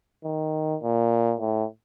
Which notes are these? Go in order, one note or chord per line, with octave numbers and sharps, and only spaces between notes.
D#3
A#2
A2